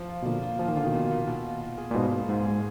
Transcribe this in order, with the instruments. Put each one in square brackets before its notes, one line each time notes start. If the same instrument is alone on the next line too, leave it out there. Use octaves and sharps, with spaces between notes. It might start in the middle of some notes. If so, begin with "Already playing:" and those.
Already playing: [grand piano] F3
F4
[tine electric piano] B2
[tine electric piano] A#2 D3 [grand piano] A#3
[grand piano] F4
[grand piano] A#2 [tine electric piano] F3
[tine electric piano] D#3
[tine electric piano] D3 [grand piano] F4
[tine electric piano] B2 D#3
[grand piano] A#2
A#2
B2
F4
F4
G#4
[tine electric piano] A#2
[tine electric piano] G#2 B2 [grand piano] F4
[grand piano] A#3
[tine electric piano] G#2 [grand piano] G#4
[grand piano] G#4